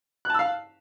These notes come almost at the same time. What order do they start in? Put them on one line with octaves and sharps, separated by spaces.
F#6 A5 E6 F5